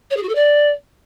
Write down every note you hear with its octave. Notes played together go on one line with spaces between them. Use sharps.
C#5
G#4
F#4
A4
D5